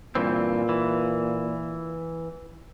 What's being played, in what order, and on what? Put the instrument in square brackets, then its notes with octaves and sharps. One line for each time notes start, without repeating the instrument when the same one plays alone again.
[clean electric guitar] G2 E3 C4 [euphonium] A#2
[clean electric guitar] E3